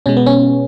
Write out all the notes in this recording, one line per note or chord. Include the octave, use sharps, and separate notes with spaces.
B2 G#3 C#4
B3
C#4